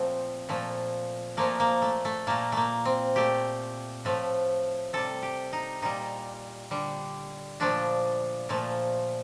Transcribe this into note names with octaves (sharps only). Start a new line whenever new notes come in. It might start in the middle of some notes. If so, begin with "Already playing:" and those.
Already playing: A#2 F3 A3 C4
A#2 F3 A3
A#2 F3 A3 A#3
A#3
A3
A3
A#2 A3 A#3
A3 A#3
C4
A#2 A3 G4
A2 F3 A3
C3 G3 A4
G4
D#4
A#2 G3 D#4
D3 G3
A#2 F3 A3 D4
A#2 F3 A3